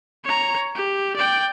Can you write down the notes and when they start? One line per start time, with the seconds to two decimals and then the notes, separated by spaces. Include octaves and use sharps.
0.24 C#5 A#5
0.74 G4
1.16 D5 G5